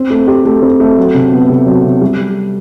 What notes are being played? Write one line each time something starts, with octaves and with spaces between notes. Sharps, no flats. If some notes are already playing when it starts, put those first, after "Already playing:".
Already playing: C4
A3
G4
A3
C4
A3
F#3
C3
B3
C3
F#3
C3
G3